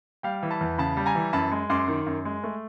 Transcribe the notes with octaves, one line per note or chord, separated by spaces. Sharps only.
G3 F5 G5
E3
A5 B5
E2
C#3 A5 B5
G3
G#5 A#5
E3
F#2 A5 B5
G#3
F#2 C6 D6
D#3
F#2
G#3
A3